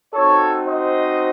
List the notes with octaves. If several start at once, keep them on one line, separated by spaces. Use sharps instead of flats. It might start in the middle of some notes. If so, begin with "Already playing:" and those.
C4 D#4 F#4 A4 C#5
C5 D#5